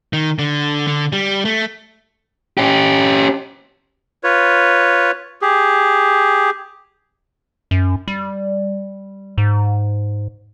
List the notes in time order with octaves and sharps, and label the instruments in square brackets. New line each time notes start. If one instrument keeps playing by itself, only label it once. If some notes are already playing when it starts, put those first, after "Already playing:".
[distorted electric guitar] D#3
D3
D3
G3
A3
[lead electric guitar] C#4 G4
[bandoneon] F4 B4 C#5
G4 G#4
[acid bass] F#2
G3
G#2